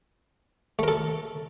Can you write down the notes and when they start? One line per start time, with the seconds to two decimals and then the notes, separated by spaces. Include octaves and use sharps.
0.79 A3
0.83 A#4
0.88 A4